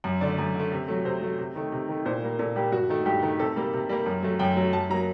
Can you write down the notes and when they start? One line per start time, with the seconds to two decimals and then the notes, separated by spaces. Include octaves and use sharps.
0.04 F#2
0.21 D3 A3 D5
0.38 F#2
0.55 D3 A3
0.72 C3
0.88 F#3 A3
1.05 C3 C5
1.22 F#3 A3
1.39 C3
1.55 D#3 A3
1.72 C3
1.88 D#3 A3
2.05 A#2 C5
2.22 G3 A#3
2.39 A#2 A4
2.56 G3 A#3 G4
2.72 G2 F#4
2.89 D#3 A3
3.05 G2 G4
3.22 D#3 A3
3.39 C3 A4
3.56 G3 A#3
3.73 C3
3.89 G3 A#3
4.06 F#2
4.23 F#3 A3
4.39 F#2 G5
4.57 F#3 A3
4.73 F#2 A5
4.90 F#3 A#3 A#5